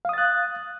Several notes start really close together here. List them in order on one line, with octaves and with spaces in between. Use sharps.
F5 D#6 A6 F#6